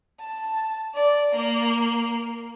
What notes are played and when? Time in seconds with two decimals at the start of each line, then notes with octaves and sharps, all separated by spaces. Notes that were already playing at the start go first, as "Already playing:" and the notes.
0.21 A5
0.95 D5
1.35 A#3